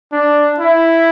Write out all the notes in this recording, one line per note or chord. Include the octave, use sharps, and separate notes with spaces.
D4
E4